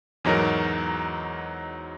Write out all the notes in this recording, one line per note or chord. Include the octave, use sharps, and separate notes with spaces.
E2 G#2 F#3 D#4 F#4 A#4